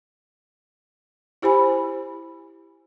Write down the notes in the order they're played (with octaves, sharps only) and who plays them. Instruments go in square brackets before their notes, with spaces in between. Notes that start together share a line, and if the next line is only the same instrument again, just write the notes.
[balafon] E4 G4 C5 G#5 B5